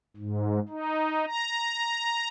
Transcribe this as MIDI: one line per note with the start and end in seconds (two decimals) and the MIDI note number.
0.17 0.59 44
0.69 1.25 63
1.27 2.28 82